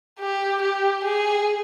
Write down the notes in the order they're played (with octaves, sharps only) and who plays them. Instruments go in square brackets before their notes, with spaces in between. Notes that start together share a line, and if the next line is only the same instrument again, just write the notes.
[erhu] G4
G4
G#4